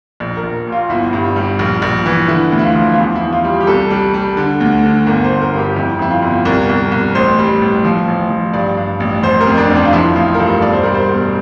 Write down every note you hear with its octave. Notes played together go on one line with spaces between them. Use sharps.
A#1
A#4
A#1
A#2
F4
G1 E4
G2
G3
A#1
A#1
E3
D3 E4
D2
E4
F4
F3
F4
E2 E4
E4
E2
F4
G3
G4
C2 A4
G3
G3
D3
D2
D3
G1 A#4
C5
G1
A#4
G2
G4
F2 E4
F2 E4
F4
G1
C2 A#4
C2
C2
A1 C5
G3
A1
F3
A1
F3
G2 D5
G2
A1
F1 C5
A#4
F2
D4
F1
D4
F4
F3 E4
A1 F4
A#4
G2 A4
E1 D5
C5
G3 A#4
C5
E1